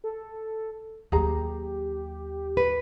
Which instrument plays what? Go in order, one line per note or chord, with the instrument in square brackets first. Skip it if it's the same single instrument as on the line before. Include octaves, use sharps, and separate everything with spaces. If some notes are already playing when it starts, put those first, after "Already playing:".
[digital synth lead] A4
[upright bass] D#2 F#3 [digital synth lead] G4 [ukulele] G#4 A#5
[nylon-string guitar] B4